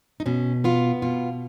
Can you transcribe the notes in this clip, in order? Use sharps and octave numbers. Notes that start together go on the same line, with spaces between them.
D#4
B2 C#4
B3 F4
B2 F4